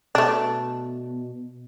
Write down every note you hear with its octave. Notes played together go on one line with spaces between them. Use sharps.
B2 A3 D4